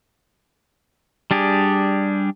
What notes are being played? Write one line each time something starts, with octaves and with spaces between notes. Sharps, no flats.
G3 D4 G4 G#4